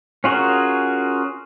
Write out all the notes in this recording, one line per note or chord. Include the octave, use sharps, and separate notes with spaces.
C#4 F4 F#4 G#4 A#4